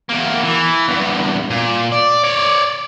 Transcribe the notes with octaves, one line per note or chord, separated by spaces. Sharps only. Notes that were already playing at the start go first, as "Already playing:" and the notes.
E2 A#3
E3
E2 G2
A#2
D5
C#5 D5